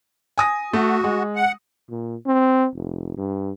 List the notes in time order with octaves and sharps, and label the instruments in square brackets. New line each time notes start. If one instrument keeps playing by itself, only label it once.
[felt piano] G#5 D#6 A#6
[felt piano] A3 [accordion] F#4
[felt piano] G#3
[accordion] F#5
[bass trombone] A#2
C4
F1
G2